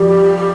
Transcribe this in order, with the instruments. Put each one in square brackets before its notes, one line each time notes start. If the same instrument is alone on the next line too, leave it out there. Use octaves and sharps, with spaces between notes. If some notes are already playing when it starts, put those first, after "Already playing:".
Already playing: [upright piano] F2 G3 [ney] G4